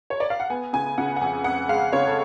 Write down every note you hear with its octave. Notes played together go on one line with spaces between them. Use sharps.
C#5
D5
F5
F#5
B3 G#5
C#3 G#5
C#3 F#5
F#5
F2 G#5
F2 F#5
G#3 F5
C#3 C#5
A4